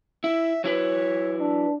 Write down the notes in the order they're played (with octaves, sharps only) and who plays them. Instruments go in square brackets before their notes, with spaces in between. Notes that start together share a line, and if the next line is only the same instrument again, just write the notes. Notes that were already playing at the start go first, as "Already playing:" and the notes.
[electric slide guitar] E4 [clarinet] E5
[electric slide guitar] F#3 E4 B4 [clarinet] C#5
[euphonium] D4